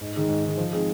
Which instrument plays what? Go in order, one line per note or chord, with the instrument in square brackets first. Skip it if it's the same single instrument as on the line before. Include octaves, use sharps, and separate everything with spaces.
[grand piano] G#2
D#3 G#3 D#4
G#2
D#3 G#3 D#4
F3
G#3 C4 D#4 G#4